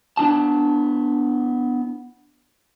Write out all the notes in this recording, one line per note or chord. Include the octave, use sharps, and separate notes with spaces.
B3 D4 E4 A5